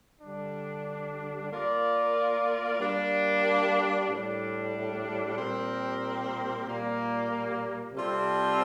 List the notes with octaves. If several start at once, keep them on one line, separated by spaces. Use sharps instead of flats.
D3 G3 D4
A#3 F4 A#4 D5
G3 A#3 D4
A2 G3 D4
A#2 G3 C4 G4 A#4
A#2 G3 A#3
C3 G3 C4 F4 A4